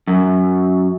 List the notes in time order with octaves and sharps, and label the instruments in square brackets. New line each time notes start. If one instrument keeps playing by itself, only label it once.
[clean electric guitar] F#2